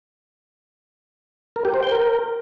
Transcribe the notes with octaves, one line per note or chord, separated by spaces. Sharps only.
A#4
G4
C5
G5
A#4